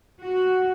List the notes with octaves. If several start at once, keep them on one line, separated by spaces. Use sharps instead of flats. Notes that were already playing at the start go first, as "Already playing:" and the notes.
F#4